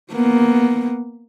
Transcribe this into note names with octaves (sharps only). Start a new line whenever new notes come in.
A#3 B3